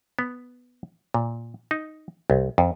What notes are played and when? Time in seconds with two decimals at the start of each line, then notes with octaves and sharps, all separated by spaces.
0.19 B3
1.14 A#2
1.71 D#4
2.30 C2
2.58 F2